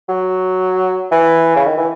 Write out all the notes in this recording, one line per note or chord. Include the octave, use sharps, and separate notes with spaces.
F#3
E3
C#3
D#3
E3